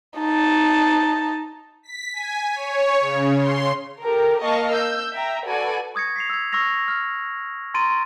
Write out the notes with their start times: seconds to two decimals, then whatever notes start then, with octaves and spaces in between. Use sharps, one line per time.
0.19 D#4 A5
1.83 B6
2.13 G#5
2.53 C#5
3.00 C#3
3.37 C6
4.00 G4 A4 A#4
4.43 A#3 D#5 F5 A5 C#6
4.71 E6 G6
5.13 E5 G5 A#5
5.45 F#4 A4 B4 D5 G#5
5.95 C#6 D#6 G#6 A#6 C#7
6.16 B6 C7 F7
6.30 E6 G#6
6.52 C#6 E6 F6 A#6 F7
6.88 F6
7.74 A#5 C6 A6 D7 D#7